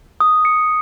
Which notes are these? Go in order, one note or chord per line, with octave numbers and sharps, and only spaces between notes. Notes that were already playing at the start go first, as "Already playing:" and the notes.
D#6
C#7